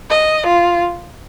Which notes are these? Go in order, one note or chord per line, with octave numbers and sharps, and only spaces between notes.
D#5
F4